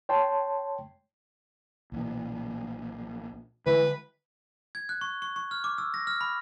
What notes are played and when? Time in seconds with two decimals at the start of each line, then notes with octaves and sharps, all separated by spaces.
0.09 C#5 G5 A5 C6
1.92 B1 A#2 E3
3.66 D3 E3 G3 G#3 B4
4.75 G#6
4.89 F#6
5.01 C#6
5.22 C#6
5.36 C#6
5.51 F6
5.64 D6
5.78 E6
5.94 A#6
6.07 F6
6.21 B5